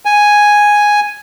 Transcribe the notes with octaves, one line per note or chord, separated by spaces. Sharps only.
G#5